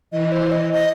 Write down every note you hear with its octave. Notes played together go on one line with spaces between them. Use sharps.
E3 D#5
C5
D#5
D#5